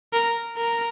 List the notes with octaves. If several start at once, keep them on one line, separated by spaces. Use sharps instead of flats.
A#4
A#4